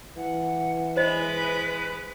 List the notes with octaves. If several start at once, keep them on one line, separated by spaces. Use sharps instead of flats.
E3 F#5
G#3 B4 C5 D#5 B5